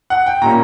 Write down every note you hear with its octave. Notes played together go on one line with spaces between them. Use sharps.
F#5
G5
A#2 G3 A#3 C#4 A#5